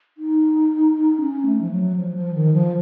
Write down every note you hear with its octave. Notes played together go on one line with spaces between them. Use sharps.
D#4
C#4
A3
F3
F#3
F3
F3
D#3
F3